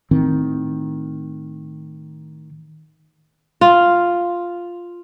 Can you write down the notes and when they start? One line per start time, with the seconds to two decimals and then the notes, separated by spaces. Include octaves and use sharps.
0.11 A2 D#3 C4
3.61 F4